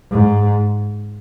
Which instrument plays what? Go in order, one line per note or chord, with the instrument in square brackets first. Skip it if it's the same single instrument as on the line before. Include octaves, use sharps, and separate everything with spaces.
[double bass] G#2